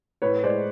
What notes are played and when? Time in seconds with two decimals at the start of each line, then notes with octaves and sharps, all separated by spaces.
0.22 A2 B4 C#5
0.44 G#3 C5 D5